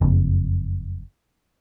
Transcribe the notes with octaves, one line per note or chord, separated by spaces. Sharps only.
F#1 F2